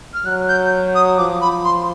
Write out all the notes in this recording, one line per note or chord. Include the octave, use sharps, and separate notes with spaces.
F6
F#3 F#6
G6
D#6
F3 D6
B5
C6